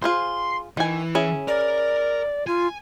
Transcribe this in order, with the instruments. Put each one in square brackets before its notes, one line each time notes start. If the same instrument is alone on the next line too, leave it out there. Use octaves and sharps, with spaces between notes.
[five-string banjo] F4 G#4 C5 [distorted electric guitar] C6
[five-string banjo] D#3 G#5 [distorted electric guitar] E3
[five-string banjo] C#4 E4 G#4
[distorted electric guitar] A#4 [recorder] D5
[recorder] F4 [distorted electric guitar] G#5